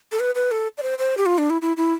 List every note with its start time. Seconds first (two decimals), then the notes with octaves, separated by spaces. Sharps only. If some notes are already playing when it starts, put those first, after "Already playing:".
0.12 A4
0.20 B4
0.35 B4
0.51 A4
0.78 D5
0.82 C5
0.99 C5
1.17 G4
1.26 F4
1.38 D4
1.50 E4
1.62 E4
1.77 E4